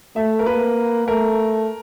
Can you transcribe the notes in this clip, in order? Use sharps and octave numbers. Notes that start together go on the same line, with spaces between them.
A3 E5
A#4
A#3 B4
A3 A#4